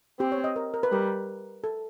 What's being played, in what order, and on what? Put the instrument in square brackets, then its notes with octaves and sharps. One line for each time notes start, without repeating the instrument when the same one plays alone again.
[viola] C4 [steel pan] G4
[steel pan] C#5
D#5
A#4
A#4
B4
[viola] G3 [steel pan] A#4
[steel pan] A4